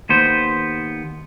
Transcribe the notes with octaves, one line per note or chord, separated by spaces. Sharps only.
D#2 B3 C5